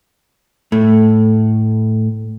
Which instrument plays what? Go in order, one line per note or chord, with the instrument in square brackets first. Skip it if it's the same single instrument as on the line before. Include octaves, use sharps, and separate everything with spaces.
[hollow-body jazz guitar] A2 A3